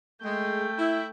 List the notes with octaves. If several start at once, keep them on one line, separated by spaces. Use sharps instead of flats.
G#3 A3 G5
E4